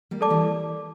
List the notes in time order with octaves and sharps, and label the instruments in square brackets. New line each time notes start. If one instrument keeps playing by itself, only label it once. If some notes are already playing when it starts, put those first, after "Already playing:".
[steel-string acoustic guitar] G3 A#3
[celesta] A4 D5 A5 D6
[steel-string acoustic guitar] E3 G3